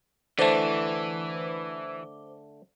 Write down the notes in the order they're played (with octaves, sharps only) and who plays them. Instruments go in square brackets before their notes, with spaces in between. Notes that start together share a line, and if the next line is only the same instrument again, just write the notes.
[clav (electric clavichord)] D3 A3 [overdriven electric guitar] E3 [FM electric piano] C5 D6